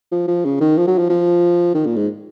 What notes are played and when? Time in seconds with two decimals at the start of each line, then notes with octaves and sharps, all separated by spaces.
0.12 F3
0.28 F3
0.45 C#3
0.61 D#3
0.77 F3
0.87 F#3
0.98 F3
1.10 F3
1.74 D#3
1.86 A#2
1.96 G#2